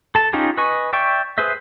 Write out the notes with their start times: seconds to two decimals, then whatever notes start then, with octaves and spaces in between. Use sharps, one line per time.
0.15 A4 A5
0.33 C#4 D#4 F4 G4 G#4
0.57 B4 D#5 G#5 C#6
0.93 D5 E5 G5 C#6
1.38 G#4 B4 C5 E5